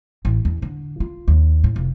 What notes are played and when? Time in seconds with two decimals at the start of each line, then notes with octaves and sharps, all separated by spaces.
0.25 A1
0.45 E2
0.62 D3
1.00 F4
1.28 D#2
1.64 A2
1.76 F1